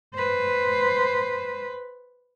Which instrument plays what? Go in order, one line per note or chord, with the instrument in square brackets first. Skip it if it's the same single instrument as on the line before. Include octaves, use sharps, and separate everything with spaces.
[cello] B4 C5